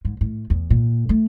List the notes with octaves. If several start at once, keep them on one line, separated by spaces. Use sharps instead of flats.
G#2
A2
E2
A#2
A3